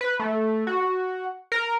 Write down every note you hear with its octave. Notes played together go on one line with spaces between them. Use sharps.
B4
A3
F#4
A#4